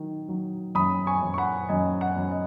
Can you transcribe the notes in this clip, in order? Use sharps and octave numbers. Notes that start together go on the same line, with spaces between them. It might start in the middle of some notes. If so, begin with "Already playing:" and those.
Already playing: D#3 F#3
F#3
F#2 B5 D#6
G#5 C#6
F#2
C#6
F#5 B5
F#2 D#5 G#5
F#5
F#2
D#5